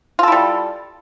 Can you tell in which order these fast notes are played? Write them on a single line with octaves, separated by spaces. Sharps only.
F4 A4 E4 G3